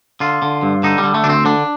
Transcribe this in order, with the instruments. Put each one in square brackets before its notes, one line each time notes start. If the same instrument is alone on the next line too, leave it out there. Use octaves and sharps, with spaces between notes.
[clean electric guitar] D3 F4
D3
G2
D3 D#4
G3
D3
A3
D2 D4
C4
D3 D4